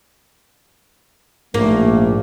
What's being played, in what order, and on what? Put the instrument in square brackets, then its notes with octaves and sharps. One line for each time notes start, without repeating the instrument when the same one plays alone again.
[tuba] A#1 [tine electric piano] G#2 [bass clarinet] A3 [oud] A#3